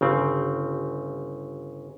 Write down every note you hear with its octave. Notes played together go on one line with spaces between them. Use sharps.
G1 C#3 C4